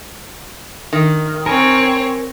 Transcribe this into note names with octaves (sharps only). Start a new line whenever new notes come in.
D#3
C4 A#4 C#5 G#5